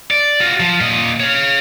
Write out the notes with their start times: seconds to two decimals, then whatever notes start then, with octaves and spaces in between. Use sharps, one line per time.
0.11 D5
0.40 F4 F#4
0.60 F3
0.81 A#2 D#5
1.20 C#5 F5